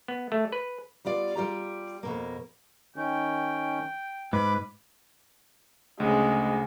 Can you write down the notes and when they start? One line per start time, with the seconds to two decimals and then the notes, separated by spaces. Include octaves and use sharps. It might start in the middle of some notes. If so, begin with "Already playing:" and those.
0.08 B3
0.32 A3
0.52 B4
1.05 G3 B3 F4 D5
1.35 G3 F4 G4 A#5
2.03 F2 B2 A#3
2.96 D#3 C#4 G5
4.33 G#2 B4 B5 D6
6.00 D2 C#3 G#3